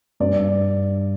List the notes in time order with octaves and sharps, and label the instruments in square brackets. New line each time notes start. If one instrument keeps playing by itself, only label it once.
[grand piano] G2 G3 D5